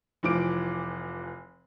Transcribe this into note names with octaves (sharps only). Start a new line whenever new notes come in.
F1 E3 F3 D6 D7